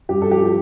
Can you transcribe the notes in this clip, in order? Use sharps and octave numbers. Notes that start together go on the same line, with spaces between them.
G2 G4
A4
F3 G4